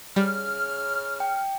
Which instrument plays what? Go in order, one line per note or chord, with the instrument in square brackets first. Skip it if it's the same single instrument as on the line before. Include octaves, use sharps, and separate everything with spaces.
[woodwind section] C#3 F6 [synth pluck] G3
[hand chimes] G5